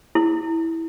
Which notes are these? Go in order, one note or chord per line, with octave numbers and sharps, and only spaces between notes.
E4